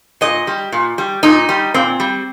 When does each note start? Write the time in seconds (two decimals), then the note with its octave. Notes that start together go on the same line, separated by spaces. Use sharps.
0.21 A#2 D#5
0.47 G3
0.72 A#2
0.98 G3
1.23 A#2 D#4
1.49 G3
1.74 A#2 C4
2.00 G3